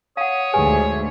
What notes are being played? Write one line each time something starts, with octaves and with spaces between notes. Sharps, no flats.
C#5 F5 F#5 D#6
D2 G#2 G4 G#4 B4 G#5